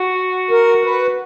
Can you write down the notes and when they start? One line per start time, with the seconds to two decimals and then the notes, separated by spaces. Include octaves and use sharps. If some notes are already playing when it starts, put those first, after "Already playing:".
Already playing: F#4
0.51 A#4
0.84 B4